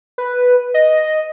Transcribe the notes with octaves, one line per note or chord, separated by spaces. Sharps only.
B4
D#5